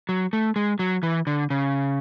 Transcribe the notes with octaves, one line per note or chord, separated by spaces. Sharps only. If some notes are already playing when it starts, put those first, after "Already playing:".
F#3
A3
G#3
F#3
E3
D3
C#3